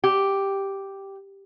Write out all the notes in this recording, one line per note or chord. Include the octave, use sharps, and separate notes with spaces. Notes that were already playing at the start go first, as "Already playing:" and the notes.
G4